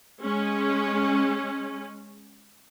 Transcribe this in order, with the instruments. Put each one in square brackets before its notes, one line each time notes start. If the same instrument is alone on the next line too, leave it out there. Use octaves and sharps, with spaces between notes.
[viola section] G#3 C#4